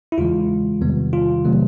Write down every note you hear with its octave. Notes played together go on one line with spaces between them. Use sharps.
E4
E2 C#3 E3 G#3 F4
E2 C3 D#3 G3 B3
F4
C3 D#3 F#3 A3